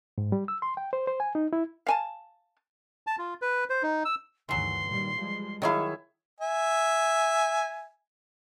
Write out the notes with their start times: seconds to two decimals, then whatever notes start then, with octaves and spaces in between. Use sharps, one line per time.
0.18 G#2
0.32 G3
0.48 E6
0.62 C6
0.77 G5
0.93 C5
1.07 C5
1.20 G#5
1.35 D#4
1.53 E4
1.87 F5 G#5 A5
3.07 A5
3.19 F4
3.42 B4
3.70 C5
3.83 D#4
4.05 E6
4.49 D2 G2 D#3 E3 F#3 C6
4.87 A#2 D#3 G3
5.18 F3 G3 G#3
5.62 D#3 F#3 E4 G#4 C#5 F5
6.40 E5 G#5